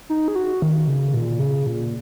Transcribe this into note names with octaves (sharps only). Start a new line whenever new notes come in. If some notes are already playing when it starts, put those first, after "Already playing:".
D#4
G#4
F#4
D#3
C#3
A#2
C#3
A#2